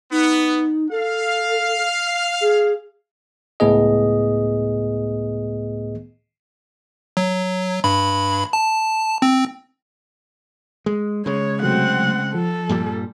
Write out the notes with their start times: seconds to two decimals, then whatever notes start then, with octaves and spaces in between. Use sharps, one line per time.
0.11 B3 D#4
0.91 A4 F5
2.41 G#4
3.60 C#2 A2 B3 G#4 D#5
7.17 F#3
7.84 G2 B5
8.53 A5
9.22 C4
10.86 G#3
11.26 C#3 G#3 C#5
11.62 C3 F#3 A3 C4 F#5
12.34 F3 A4
12.69 G2 A#2 G3